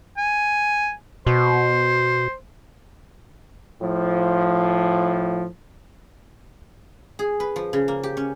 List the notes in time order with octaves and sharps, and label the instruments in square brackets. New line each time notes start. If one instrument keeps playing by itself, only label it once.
[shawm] G#5
[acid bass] B2 [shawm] C5
[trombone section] A2 F3
[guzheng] G#4
B4
F3
C#3
A#3
G4
C#4